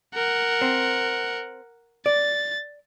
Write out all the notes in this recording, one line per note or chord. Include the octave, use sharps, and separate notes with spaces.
A#4 F#5
C4
D5 A6